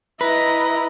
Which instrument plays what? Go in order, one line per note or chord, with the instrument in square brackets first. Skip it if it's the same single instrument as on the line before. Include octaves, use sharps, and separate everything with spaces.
[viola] E4 D#5 [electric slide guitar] B4 [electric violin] A#5